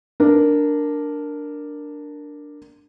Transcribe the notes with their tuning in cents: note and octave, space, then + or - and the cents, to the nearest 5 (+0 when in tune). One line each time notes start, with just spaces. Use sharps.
D4 +0 A#4 -5